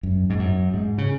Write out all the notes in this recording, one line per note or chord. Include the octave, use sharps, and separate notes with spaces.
F#2
G#2
F#2
G#2
C#3